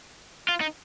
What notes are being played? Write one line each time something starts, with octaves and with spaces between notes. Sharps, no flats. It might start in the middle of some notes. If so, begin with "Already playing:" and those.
F4
D#4